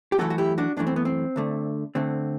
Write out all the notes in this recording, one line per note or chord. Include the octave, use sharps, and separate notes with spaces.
G4
F#2 E3 A3 F#4 A4
F#4
E4 G4
D4 F#4
F#2 E3 A3 D4
C4
B3
C4
D2 D3 A3
D2 D3 A3 C4